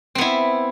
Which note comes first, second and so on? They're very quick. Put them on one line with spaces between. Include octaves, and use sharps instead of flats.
C4 B3 E4